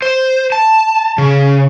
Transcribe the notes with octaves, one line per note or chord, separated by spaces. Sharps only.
C5
A5
C#3